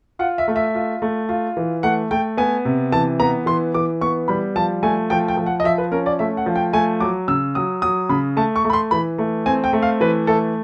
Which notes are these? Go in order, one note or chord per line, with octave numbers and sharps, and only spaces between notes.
F4 F#5
E5
A3
E5
F4
A3
F4
E3
A3 F#5
A3 G5
B3 G#5
C3
E3 A5
B3 A#5
E3 C6
E3 D6
B3 C#6
G3 B5
F3 A5
A3 G#5
F3 G5
G5
F3
F#5
D#5
F3 E5
B4
C#4 A#4
D5
A3 E5
F#5
F3
G5
A3 G#5
F#3 D6
C#3 E6
F#3 D#6
F#3 D#6
C#3 B5
A3 A5
C#6
A3
B5
C6
E3 B5
A3
C4 G#5
G5
A3
F5
E3 B4
A3 A4